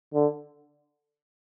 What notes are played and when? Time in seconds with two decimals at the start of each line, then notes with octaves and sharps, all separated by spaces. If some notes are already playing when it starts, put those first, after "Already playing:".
0.14 D3